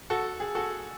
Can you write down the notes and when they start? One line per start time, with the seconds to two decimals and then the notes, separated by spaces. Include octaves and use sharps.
0.10 F#4 A4
0.40 G#4
0.55 F#4 A4